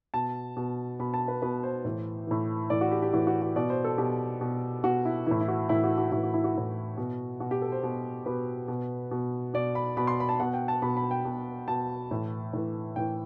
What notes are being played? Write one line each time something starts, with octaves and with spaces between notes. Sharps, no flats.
B2 A5
B2
B2 B5
A5
B4
B2 B4
C5
A2 E3
A2 E3
A2 E3 D5
F#4
G4
G4
A2 E3 F#4
F#4
F#4
B2 D5
C5
A4
B2 G4
B2
B2 F#4
E4
A2 E3 E4
E4
F#4
A2 E3 E4
F#4
F#4
A2 E3 F#4
F#4
E4
F#4
A2 E3
B2
B2 F#4
G4
A4
C5
B2
B2 B4
B2
B2
B2 D5
B5
B2 B5
C6
B5
A5
B2 F#5
G5
A5
B2 B5
B5
G5
B2
B2 A5
A2 E3
A2 E3
A2 E3 G5